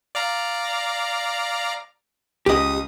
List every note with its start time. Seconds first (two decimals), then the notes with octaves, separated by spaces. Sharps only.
0.15 D5 F5 A#5
2.46 C#2 G4 D#5 D#6